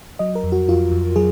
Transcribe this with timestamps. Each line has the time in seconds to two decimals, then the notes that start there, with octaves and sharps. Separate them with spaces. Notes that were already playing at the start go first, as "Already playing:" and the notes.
0.19 F#3 D#5
0.35 A#4
0.44 F2
0.52 F#4
0.69 F2 F4
0.92 F2
1.16 F#3 G#4